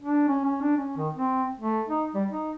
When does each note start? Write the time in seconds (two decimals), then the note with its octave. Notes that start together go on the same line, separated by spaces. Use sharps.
0.02 D4
0.28 C#4
0.45 C#4
0.62 D4
0.77 C#4
0.97 D#3
1.15 C4
1.60 A3
1.88 D#4
2.15 G3
2.28 D#4